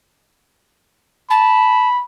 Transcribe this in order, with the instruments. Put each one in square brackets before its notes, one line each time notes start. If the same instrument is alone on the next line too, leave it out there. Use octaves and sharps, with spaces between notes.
[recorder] A5 [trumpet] B5